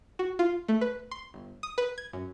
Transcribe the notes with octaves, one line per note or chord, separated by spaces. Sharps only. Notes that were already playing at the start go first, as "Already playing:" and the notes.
F#4
F4
A3
B4
C6
G1
D#6
B4
G#6
F#2